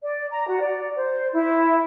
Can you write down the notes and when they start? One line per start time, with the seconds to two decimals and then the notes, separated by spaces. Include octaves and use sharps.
0.03 D5
0.30 A#5
0.48 F#4
0.61 D5
0.97 C5
1.32 E4